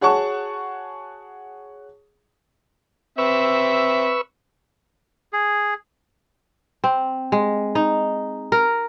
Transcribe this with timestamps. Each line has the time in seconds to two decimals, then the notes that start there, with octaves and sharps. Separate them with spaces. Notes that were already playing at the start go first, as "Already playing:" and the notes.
0.01 F#4 G#4 C#5 F#5 A5 C#6
3.18 C4 B4 E5 C#6 E6
5.33 G#4
6.84 C4
7.32 G#3
7.75 D#4
8.52 A#4